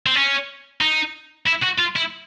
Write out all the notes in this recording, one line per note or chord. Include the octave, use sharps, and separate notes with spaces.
C4
C#4
D#4
E4
F#4
F4
E4